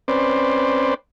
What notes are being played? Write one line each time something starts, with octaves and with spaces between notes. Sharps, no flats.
C4 C#4 B4 C5 D5